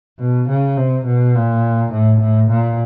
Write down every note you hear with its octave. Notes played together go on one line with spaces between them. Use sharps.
B2
C#3
C3
B2
A#2
A2
A2
A#2